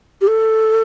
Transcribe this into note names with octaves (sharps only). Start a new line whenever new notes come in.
G4
A4